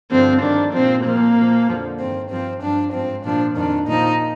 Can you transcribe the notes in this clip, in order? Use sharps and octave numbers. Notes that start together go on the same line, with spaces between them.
G2 D3 F3 C4
G2 D#3 D4
A#2 F3 C4
A#2 F3 A#3
A#2 F3
F2 D3 F3
G2 D#3 C4
G2 F3 C4
G2 F3 D4
G#2 F3 C4
A#2 F3 D4
F2 D#3 D4
A#2 F3 D#4